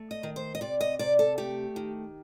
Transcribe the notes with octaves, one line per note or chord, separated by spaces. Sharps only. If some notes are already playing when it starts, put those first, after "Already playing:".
Already playing: A3
D#5
D#3
C5
D#5
C3 D5
D#5
C3 D5
A4
A3 G4
D#3